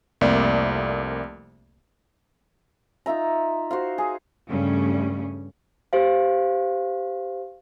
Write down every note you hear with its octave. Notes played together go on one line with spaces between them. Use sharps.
C2 F2 A3 A#3 D5
D#4 F4 E5 A#5
F#4 C5 F5
G#4
G2 C#3 G3 A3 C#4
G4 C5 F5